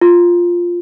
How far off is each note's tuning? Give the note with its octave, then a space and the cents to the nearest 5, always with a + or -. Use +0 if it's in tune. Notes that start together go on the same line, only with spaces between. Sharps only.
F4 +0